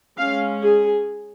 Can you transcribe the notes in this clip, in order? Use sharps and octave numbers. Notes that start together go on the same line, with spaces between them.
G#3 C#4 F5
G#4